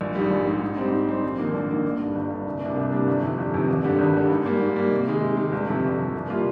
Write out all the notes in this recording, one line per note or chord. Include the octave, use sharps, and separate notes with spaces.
A#1
G#2 G3
A#1
G#2 G3
G#2
G3 C4 D#4
G#2
G3 C4 D#4
A#1
G#2 D#3 A#3 D4
A#1
G#2 D#3 A#3 D4
G1
G2 D3
G1
G2 D3
C2
C3 G3 A#3 D4
C2
C3 G3 A#3 D4
G1
F2 C3 D#3
G1
F2 C3 D#3
G#1
G2 D3 G3
G#1
G2 D3 G3
G#2
G3 A#3
G#2
G3 A#3
C3
D#3 G#3
C3
D#3 G#3
G1
F2 C3
G1
F2 C3
C2
C3 G3 A#3 F4